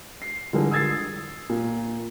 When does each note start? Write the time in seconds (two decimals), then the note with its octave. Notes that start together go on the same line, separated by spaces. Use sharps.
0.22 C7
0.53 D3 E3 F3 G3 G#4 A#4
0.71 D#6 E6 G#6 A6 C7
1.49 A#2